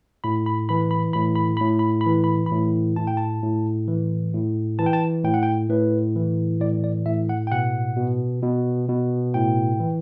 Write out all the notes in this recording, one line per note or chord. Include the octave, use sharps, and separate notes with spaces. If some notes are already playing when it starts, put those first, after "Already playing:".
A2 B5
B5
E3 B5
B5
A2 B5
B5
A2 B5
B5
B5
E3
B5
B5
A2
A2 A5
G5
A5
A2
E3
A2
E3 A5
G5
A5
A2 G5
F#5
G5
A2 B4
E3
A2 D5
D5
A2 E5
F#5
G5
B2 F#5
B2
B2
B2
A2 G5
E3